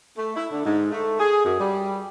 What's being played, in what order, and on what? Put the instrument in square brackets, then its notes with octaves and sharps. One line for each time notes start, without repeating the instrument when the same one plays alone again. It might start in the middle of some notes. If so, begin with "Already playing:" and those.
[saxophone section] A3
E4
D3
G#2
A3
G#4
F#2
G3